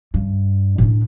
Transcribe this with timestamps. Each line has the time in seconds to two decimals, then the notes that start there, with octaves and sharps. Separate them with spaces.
0.14 G2
0.78 A2 D4